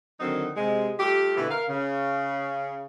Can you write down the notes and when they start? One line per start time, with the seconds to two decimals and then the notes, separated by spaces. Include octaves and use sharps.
0.20 D3 D#3 F#3 C4 D#4
0.56 C3 G#3
0.99 G3 A3 F4 G4
1.37 B2 D3 E3
1.50 A#4 F5
1.69 C#3